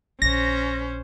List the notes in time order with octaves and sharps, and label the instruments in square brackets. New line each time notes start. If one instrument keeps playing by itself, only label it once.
[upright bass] A#1 D3 [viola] C#4 C5 [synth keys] A#6